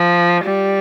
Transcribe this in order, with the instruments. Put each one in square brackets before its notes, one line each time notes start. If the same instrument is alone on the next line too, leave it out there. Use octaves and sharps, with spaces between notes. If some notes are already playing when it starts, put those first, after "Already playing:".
Already playing: [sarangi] F3
G3